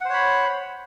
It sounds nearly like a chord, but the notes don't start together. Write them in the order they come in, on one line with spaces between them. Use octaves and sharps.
F#5 C5 C#5 B5